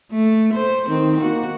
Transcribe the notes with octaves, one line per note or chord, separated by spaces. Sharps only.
A3
C5
D#3 C4
A#3 F#4